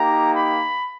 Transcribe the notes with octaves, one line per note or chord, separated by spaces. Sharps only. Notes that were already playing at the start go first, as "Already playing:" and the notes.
Already playing: A#3 D#4 G4 A#5
B5